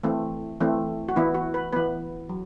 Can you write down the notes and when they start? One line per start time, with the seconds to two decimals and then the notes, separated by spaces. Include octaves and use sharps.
0.03 E3 A3 C4
0.60 E3 A3 C4
1.09 F#4
1.16 E3 B3 E4
1.34 F#4
1.54 B4
1.73 E3 B3 B4
2.29 F#3